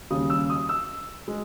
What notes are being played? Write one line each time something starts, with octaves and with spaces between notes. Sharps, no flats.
D#2 C#3 G3 D#6
E6
D#6
E6
G#3